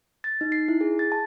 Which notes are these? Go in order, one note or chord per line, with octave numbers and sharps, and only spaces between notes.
A6
D#4
C7
E4
G#4
A6
A5